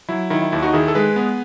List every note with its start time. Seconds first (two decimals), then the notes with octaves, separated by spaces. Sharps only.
0.09 F#3 E4
0.30 D#3 E4
0.42 E4
0.52 D#2 E4
0.63 D#4 F#4
0.73 D#3 E4 G#4
0.88 A4
0.95 G#3 G#4 B4
1.16 B3